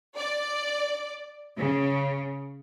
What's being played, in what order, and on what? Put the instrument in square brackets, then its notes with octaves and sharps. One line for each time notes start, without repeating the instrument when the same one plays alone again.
[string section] D5
C#3